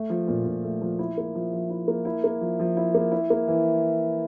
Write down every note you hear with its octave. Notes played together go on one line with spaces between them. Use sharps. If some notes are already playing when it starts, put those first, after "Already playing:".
Already playing: A3
F3
A#2
A#2
A3
F3
E4
A#3
F3
F3
E4
A#3
E4
A#3
F3
F3
E4
A#3
E4
A#3
E3